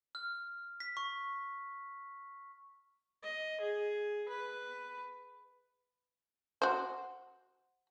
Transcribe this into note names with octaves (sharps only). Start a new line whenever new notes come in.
F6
B6
C#6
D#5
G#4
B4
F#4 C5